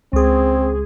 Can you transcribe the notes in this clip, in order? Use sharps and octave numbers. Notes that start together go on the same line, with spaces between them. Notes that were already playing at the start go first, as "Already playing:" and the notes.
C#2 C4 G#4